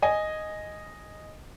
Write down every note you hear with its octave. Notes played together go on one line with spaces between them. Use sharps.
D#5 G#5